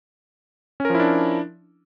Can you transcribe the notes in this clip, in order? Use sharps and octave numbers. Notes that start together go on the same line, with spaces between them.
F3 C#4 D4 E4 A#4